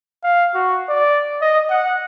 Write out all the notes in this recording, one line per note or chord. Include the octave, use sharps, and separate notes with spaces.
F5
F#4
D5
D#5
F#5